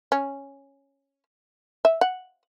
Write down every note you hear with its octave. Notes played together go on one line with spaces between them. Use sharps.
C#4
E5
F#5